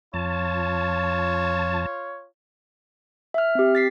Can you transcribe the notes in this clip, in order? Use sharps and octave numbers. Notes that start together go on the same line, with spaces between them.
F2 F4 C#5 A5
E5 F6
C4 G4
A6 B6 C7